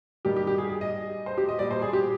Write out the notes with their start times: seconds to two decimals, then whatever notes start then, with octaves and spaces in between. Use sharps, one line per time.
0.25 G2 D#3 G3 G4
0.36 G4
0.47 G4
0.58 G#4
0.69 G#4
0.81 D#5
1.26 C5
1.38 G4
1.49 D#5
1.59 A#2 G3 D5
1.71 C5
1.82 G#4
1.93 G4